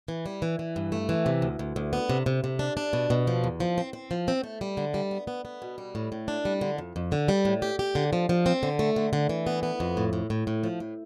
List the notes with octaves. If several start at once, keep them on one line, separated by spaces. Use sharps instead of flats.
E3
G3
E3
E3
G2
A3
E3
C3
D2
D2
D2
B3
C3
C3
C3
D4
D4
B2
B2
F3
E2
F3
C4
C4
F3
C4
A3
G3
D3
G3
B3
B3
B3
B2
G3
A2
A2
D4
G3
D3
F2
F2
D3
G3
A2
G4
G4
D3
F3
F3
C4
D3
A3
D3
D3
E3
B3
B3
F2
A2
A2
A2
A2
F3
A2